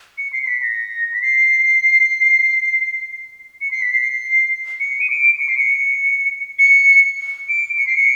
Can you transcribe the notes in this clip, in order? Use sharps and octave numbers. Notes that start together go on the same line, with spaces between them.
C#7
C7
C7
B6
A#6
B6
C7
C#7
C7
B6
C7
C#7
D#7
D7
C#7
C7
C#7
C#7
D7
C#7
C7
C#7